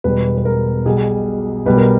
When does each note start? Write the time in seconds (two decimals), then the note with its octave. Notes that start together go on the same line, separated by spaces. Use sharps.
0.04 E1 E2 B2 G3 B4
0.38 B4
0.45 A#4
0.85 B1 B2 G3 G#4
1.66 B1 B2 G3 B4
1.77 A#4